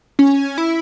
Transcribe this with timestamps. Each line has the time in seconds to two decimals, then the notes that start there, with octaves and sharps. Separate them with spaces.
0.19 C#4
0.58 E4